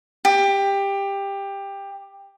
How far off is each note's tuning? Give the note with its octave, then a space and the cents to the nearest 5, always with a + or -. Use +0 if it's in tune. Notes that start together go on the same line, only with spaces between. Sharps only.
G4 +15